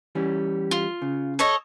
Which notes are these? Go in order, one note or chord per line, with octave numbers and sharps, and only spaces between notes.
E3 G3 C#4
F4
C#3
A4 C#5 D#5